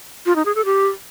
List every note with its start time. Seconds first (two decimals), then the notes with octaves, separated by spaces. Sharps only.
0.26 F4
0.36 D#4
0.45 G#4
0.55 A4
0.65 G4